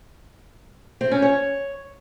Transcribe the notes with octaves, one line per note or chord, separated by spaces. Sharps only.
C4
C#4
C#5